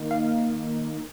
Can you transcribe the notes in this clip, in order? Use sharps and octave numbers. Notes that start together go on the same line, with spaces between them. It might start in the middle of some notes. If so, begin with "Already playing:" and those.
Already playing: D#3 A#3 D#4
F5